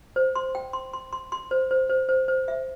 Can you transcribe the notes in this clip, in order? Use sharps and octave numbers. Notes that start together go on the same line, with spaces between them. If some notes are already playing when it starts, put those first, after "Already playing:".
C5
C6
G5
C6
C6
C6
C6
C5
C5
C5
C5
C5
E5